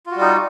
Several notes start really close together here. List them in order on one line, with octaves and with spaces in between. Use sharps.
F4 F#4 G3 D#4